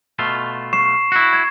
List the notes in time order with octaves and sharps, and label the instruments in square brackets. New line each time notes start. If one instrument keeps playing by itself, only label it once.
[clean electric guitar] B2 A3 F4
[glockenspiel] C#6 C7 E7
[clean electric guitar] E4 F#4
[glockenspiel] G#6